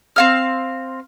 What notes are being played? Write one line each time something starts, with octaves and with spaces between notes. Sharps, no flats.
C4 F5 F6